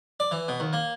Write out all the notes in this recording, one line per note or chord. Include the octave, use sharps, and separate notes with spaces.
D5
E3
B2
D#2
A#3